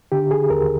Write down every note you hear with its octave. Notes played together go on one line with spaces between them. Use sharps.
D3 G4
G#4
D#2 A#4